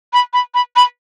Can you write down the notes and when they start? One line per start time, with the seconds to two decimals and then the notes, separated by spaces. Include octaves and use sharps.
0.13 B5
0.33 B5
0.54 B5
0.76 B5